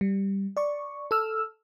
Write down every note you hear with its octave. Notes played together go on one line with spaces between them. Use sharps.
G3
D5 C#6
A4 E6 F6